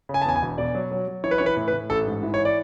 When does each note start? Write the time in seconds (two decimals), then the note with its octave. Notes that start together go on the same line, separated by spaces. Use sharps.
0.09 C#3
0.14 G#5
0.22 A5
0.25 E2 G#5
0.36 G#5
0.42 E1
0.58 B2 D5
0.75 F#3
0.91 F#3
1.08 F#3
1.24 E3 C#5
1.31 B4
1.38 E3 C#5
1.46 B4
1.57 A2
1.68 B4
1.73 A2
1.90 A1 A4
2.06 G#2
2.23 E3
2.34 C#5
2.45 D5